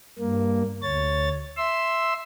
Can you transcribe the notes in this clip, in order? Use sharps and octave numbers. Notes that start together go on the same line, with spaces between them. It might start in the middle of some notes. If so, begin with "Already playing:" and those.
G2 A#3
D2 C#5 A6
E5 C6 E6